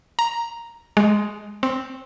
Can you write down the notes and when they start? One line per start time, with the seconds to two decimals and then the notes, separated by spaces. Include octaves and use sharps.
0.19 A#5
0.97 G#3
1.63 C4